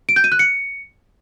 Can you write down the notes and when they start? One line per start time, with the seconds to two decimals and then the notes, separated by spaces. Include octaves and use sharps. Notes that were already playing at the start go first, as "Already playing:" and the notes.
0.09 D7
0.16 G6
0.24 D#7
0.32 F#6
0.39 C#7